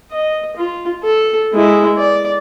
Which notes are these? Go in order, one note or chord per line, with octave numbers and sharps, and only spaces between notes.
D#5
F4
A4
G#3 E4
D5